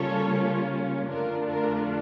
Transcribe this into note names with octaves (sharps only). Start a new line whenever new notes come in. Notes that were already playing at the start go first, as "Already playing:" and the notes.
Already playing: C#3 G3 A#3 C#4 F4 A4 C#5
F2 D3 A3 D4 F4 A#4
A#4